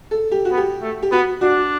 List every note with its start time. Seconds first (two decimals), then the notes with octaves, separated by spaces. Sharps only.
0.11 A4
0.32 G4
0.45 F#4
0.51 B3
0.57 G4
0.82 A3
1.03 G4
1.12 B3 F#4
1.41 D4 F#4